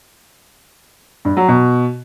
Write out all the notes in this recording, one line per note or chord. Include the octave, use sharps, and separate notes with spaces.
G2
F#3
B2